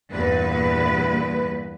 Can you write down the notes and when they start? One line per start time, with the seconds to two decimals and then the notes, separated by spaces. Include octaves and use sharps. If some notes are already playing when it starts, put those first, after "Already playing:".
0.10 E2 G2 A#2 B4